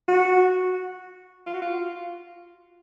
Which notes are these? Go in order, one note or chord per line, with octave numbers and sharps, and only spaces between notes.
F#4
F4
F#4
F4